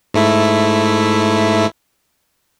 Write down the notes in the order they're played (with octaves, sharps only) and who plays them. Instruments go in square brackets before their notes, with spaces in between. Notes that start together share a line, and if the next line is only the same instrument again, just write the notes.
[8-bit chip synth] G#2 A3 E4